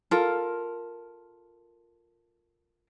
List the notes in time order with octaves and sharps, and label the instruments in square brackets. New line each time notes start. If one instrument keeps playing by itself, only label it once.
[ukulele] F4 A4 A#4